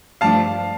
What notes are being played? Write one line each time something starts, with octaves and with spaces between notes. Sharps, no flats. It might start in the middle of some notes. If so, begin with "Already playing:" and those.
G2 F3 A3 D4 F5 A5